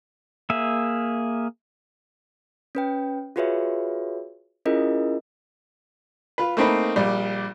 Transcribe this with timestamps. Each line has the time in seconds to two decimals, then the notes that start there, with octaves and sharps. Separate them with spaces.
0.50 A#3 G#4 E5
2.75 C#4 B4 G5
3.36 F4 F#4 G#4 B4 C#5 E5
4.66 C#4 E4 F4 G#4 A#4 D#5
6.38 F4 B4
6.57 A3 A#3 C4 D#4 B4
6.96 A#1 G3